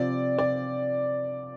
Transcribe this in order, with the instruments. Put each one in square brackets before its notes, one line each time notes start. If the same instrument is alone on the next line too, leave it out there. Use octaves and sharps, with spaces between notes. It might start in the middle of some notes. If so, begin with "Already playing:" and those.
Already playing: [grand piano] C3 F3 C4 F4 [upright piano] D5
[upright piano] D5